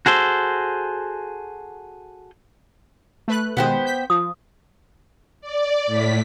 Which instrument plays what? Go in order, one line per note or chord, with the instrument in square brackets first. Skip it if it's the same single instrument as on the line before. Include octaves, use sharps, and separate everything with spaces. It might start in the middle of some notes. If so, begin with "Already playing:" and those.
[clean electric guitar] F#4 G#4 A4 C5
[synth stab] A3 B4 F#6
[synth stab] B2 D#3 G#3 [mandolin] B3 G4 C5
[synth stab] G6 B6
[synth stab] F3 [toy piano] D#6
[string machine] D5
A2 B6